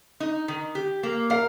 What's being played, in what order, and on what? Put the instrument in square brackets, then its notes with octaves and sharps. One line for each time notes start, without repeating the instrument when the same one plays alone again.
[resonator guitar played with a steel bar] D#4
D#3
G4
A#3
[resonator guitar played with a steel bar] A#4 [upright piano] F5